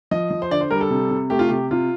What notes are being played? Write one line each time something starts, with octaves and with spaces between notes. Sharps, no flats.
F3 D#5
F3
C5
D3 D5
C5
G3 A#4
A4
C3
C3
A3 G4
F4
C3 G4
C3 F4